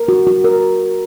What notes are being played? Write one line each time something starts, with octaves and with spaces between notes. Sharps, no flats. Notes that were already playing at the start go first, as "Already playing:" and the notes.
Already playing: A#4
F#4
F#4
A#4